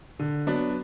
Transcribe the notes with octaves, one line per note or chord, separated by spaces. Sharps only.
D3
F#3 B3 D4